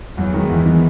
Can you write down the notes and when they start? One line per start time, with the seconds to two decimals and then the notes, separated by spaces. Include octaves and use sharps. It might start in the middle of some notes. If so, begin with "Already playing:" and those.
0.17 E2 F#3
0.34 D#3 G#3 B3
0.49 E2 E3
0.66 D#3 G#3 B3